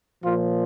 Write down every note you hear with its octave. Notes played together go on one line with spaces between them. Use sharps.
A#2 F3 F4